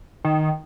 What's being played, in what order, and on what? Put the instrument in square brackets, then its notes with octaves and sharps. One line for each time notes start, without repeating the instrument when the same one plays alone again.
[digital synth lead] D#3